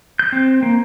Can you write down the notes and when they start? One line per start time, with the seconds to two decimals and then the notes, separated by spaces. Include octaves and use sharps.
0.19 G6
0.32 C4
0.63 A#3